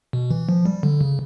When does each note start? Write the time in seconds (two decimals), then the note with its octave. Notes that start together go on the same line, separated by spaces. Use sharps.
0.13 B2
0.31 E3
0.49 F3
0.66 G3
0.83 D3
1.01 C#3